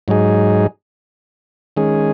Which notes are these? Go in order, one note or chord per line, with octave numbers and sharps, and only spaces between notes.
G#2 F#3 D#4 G#4
D#3 G#3 C#4 G#4